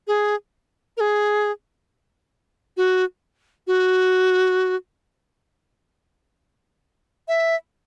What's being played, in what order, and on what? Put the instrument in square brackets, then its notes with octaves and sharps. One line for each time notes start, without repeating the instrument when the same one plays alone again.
[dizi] G#4
A#4
G#4
F#4
F#4
E5